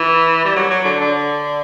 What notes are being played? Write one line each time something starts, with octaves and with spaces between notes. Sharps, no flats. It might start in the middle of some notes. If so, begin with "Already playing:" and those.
Already playing: E3
G3
F#3
F#3
D3
D3